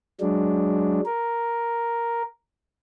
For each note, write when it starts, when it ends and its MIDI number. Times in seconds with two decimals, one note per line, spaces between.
0.21 1.01 54
0.21 1.01 56
0.21 1.01 62
1.06 2.23 70